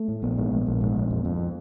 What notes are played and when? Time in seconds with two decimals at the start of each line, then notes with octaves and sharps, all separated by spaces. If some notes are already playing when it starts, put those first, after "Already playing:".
Already playing: A3
0.08 A2
0.22 A#1 B3
0.37 G#2
0.51 A#1
0.67 A#1
0.81 G#2
0.96 A#1
1.11 F2
1.25 F2